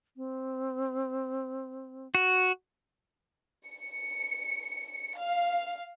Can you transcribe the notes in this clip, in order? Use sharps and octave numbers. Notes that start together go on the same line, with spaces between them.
C4
F#4
C#7
F5